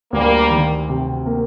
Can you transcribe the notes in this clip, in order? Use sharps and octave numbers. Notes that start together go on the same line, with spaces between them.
D2 G3 A#3
D#3
C3
A#3